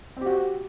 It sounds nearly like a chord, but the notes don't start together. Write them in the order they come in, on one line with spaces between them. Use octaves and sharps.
C4 G4 F#4